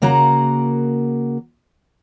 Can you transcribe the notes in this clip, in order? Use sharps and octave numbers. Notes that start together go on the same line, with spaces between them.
C#3 A#3 F#4 A#4 F#5 A#5